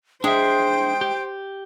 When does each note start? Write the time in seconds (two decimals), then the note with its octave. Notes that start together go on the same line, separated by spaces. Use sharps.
0.24 G#3 D4 C5 E5 G5
1.01 G4